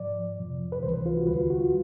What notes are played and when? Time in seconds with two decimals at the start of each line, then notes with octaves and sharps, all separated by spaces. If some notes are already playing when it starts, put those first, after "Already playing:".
Already playing: G#2 F3 D5
0.37 F2 C3 F3
0.72 B4
0.83 C#2 C3 E3 G3 C5
0.94 B4
1.06 F4
1.17 F#4
1.27 D#2 D3 G3 B4
1.38 F4
1.50 F#4
1.61 F4